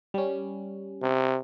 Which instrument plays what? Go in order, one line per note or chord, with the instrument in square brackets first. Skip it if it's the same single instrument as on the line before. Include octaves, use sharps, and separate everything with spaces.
[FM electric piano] G3 C#4
[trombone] C3